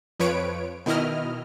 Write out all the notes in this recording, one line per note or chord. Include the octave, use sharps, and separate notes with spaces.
F2 F3 B4 C#5 D7
B2 D#3 E4 D#5 F6